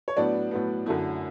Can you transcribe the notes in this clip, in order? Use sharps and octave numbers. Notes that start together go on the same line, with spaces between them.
C#5
A2 F#3 B3 D4 D5
A2 F#3 B3
F#2 D3 F#3 A3 E4